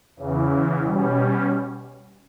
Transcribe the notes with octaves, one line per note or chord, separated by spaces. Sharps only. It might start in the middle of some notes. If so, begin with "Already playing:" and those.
E2 C#3 E3
B2 G3 C#4